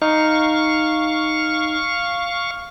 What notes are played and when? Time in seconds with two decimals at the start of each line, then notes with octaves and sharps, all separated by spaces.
0.02 D#4 F5 C#6